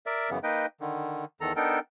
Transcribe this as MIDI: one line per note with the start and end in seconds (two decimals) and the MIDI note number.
0.06 0.30 70
0.06 0.30 74
0.06 0.30 76
0.30 0.39 42
0.30 0.39 49
0.30 0.39 52
0.30 0.39 59
0.43 0.66 58
0.43 0.66 63
0.43 0.66 71
0.43 0.66 75
0.43 0.66 79
0.81 1.25 50
0.81 1.25 51
1.41 1.53 40
1.41 1.53 51
1.41 1.53 69
1.41 1.53 82
1.56 1.79 59
1.56 1.79 62
1.56 1.79 63
1.56 1.79 69
1.56 1.79 70
1.56 1.79 79